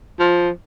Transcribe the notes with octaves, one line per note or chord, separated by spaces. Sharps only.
F3